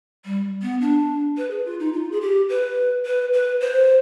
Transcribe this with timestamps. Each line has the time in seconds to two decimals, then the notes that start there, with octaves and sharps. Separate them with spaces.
0.25 G3
0.62 B3
0.81 D4
1.37 B4
1.51 G#4
1.65 F4
1.80 D#4
1.93 F4
2.12 G#4
2.21 G4
2.49 B4
3.06 B4
3.33 B4
3.61 C5